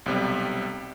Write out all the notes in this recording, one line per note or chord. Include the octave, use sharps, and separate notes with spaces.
B1 C3 G3